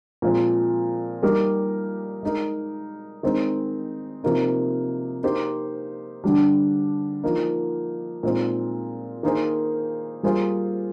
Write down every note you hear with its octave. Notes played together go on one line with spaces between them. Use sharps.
A#2 F3 G#3 C4
G3 A#3 D#4 G4 A#4
G#3 D#4 A#4
D#3 G#3 C4 D#4
C3 F3 A#3 D#4
A#3 D#4 G4 C5
D3 G3 D4
F3 A#3 D#4
A#2 G#3 C4 D#4
D#3 A#3 D#4 G#4 C5
G3 A#3 F4 G#4 C5